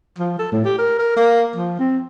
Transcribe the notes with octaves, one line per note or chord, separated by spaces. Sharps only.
F3
A4
A2
G4
A#4
A#4
A#3
F3
C4